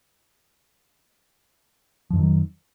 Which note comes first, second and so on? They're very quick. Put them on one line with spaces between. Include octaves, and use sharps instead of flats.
F3 F2 D#3 F#3